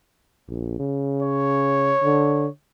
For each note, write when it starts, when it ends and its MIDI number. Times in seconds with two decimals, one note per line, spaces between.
0.48 0.75 34
0.79 1.93 49
1.23 2.48 73
2.03 2.47 50